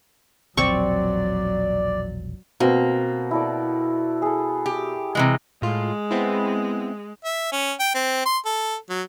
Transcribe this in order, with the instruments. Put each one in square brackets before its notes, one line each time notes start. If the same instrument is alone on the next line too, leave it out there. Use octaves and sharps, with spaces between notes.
[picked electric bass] E1 A#1 [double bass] F#3 [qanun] C4 C#6 [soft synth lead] D5
[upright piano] B2 C4 [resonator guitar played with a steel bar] A#3
[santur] E4 A4 D5
G#4 A4
[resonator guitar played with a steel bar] G4
C3 E3 G#3
[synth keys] A2 F4 [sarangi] G#3
[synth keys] B3 C4 E4
[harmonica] E5
C#4
G5
C4
C6
A4
F#3